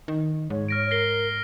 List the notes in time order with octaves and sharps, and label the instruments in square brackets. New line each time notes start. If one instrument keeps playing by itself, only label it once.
[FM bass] D#3
[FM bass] G#2 [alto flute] C#5
[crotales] F6 A#6 D7
[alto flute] A#4 [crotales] A#6 C7 G7